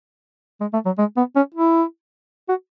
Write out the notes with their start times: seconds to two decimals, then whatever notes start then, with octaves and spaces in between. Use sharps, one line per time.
0.61 G#3
0.73 A3
0.85 F#3
0.98 G#3
1.17 B3
1.36 C#4
1.55 E4
2.49 F#4